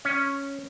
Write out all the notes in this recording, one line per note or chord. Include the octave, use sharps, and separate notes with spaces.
C#4